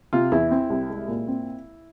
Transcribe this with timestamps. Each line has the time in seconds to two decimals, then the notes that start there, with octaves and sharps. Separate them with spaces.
0.13 C3 F4
0.32 E2 E4
0.51 C4
0.70 C2
0.90 G#3
1.08 A#2
1.28 C4